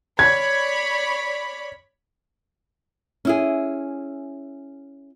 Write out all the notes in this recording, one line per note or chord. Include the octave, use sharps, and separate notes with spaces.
C#5 D5 B5 G#6
C#4 E4 G#4